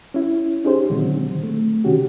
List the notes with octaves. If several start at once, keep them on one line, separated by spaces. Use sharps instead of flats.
C#4 E4
C#4 D#4 G4 G#4 C5
A#2 D3 D#3 F#3 G#3 C4
A3
C3 D#3 C#4 F#4 G4